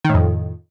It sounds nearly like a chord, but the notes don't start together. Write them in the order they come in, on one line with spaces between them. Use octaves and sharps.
D#3 A2 F2